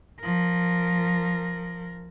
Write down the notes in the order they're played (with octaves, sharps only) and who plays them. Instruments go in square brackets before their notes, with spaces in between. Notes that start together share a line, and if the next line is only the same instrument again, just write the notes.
[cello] F3 A#4